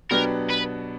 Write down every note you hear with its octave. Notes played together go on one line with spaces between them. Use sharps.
B2 F#3 B3 D4 G4 A#4
B4